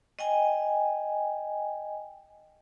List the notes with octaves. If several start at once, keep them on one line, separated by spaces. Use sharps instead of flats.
D#5 G5 G#5